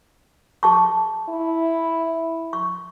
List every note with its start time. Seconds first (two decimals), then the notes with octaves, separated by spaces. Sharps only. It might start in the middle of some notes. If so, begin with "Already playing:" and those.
0.63 G#4 A5 C#6
1.29 E4
2.53 C#6